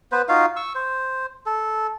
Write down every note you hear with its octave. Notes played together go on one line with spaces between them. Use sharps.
B3 B4 C5
D#4 F4 F#4 F5
C#6 E6
C5
A4